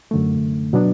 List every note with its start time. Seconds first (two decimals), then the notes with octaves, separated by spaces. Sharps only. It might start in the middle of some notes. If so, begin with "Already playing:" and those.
0.11 F#2 D3 A3
0.73 B2 F#3 B3 D4